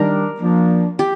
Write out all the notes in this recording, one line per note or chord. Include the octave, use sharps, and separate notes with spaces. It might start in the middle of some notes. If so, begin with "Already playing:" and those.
Already playing: D#3 G3 D4 A#4
F3 A#3 D4
G4